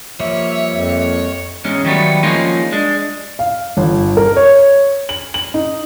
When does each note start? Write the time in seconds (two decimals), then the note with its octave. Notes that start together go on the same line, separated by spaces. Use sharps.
0.20 F3 G3 A#3 C#5 E5
0.72 F2
1.65 E2 G#2 G#3 C#4
1.85 D#3 F#3 G3 A3 B3
2.23 F3 G#3 A#3 C#4 D#4 F4
2.72 G#3 D4
3.39 F5
3.77 G1
4.17 A#4
4.36 C#5
5.09 F#7
5.34 F#7
5.54 D#4